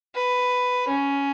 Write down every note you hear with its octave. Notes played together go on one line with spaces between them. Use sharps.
B4
C#4